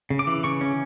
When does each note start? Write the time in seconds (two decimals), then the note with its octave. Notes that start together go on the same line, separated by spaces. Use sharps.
0.10 C#3
0.19 D6
0.27 E3
0.44 C#3 C#6
0.61 C#4